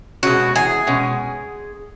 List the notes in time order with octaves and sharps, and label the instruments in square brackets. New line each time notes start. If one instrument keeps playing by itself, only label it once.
[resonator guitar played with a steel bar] B2 G#3 C#4 [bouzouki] F#4
[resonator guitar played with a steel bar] E2 [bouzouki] G#4
[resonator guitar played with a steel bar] B2 G#3 C#4